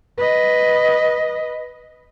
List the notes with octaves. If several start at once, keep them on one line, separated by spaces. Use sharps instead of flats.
B4 D#5